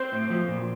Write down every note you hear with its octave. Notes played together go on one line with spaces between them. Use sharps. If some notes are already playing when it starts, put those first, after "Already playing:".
Already playing: C4 C5
A2
F3
A#2